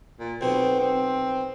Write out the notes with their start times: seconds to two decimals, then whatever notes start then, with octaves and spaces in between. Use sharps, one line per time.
0.20 A#2
0.41 B1 B2 C4
0.80 C4